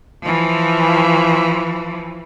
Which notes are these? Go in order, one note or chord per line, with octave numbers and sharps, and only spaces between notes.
E3 F3